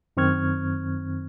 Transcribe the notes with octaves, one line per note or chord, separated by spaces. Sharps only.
F#2 D#3 C4 C#6 F6 G#6